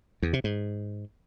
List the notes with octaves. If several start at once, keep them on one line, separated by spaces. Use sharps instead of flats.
E2
C3
G#2